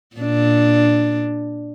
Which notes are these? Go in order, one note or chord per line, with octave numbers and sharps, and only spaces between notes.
A#2 D4